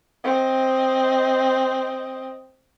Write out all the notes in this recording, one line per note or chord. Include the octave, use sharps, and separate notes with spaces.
C4 D#5